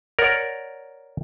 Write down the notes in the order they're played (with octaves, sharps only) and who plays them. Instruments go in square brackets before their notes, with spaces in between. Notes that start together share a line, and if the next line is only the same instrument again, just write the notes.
[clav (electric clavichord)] A#4 C#5 D5 F#5